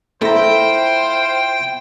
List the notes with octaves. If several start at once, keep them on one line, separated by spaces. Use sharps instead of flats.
A3 E4 F4 C5 G5 A#5